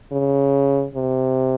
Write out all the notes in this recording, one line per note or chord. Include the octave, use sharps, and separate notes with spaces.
C#3
C3